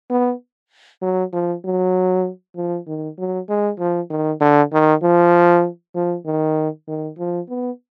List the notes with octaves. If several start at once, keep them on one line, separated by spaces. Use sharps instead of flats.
B3
F#3
F3
F#3
F3
D#3
F#3
G#3
F3
D#3
D3
D#3
F3
F3
D#3
D#3
F3
B3